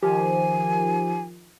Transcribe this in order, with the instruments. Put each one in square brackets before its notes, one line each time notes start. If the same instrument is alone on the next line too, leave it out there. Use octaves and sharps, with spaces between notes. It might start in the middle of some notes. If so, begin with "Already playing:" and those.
[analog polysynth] D#3 F3 [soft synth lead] G4 [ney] G#5